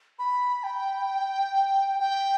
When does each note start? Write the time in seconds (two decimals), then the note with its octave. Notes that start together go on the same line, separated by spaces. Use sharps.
0.19 B5
0.64 G5
2.00 G5